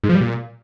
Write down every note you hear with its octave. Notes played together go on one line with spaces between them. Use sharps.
G#2
F3
G3
A#2